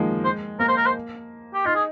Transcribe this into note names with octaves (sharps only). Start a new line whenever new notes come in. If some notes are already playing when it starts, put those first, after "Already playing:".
Already playing: D#3 F3 G#3 A#3
C5
A#3 A#4
C5
A#4
C5
G4
D#4 F4
G#4